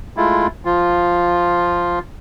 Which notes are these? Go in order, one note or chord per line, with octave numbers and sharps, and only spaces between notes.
G#3 A3 E4 F4
F3 F4